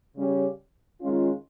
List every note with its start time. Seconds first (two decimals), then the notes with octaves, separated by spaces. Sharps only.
0.17 C#3 G3 C#4 G4 C#5
1.01 D#3 G#3 C#4 F4